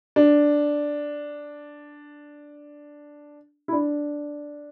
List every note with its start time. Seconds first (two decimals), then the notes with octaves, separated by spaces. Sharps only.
0.16 D4
3.68 E4
3.72 D4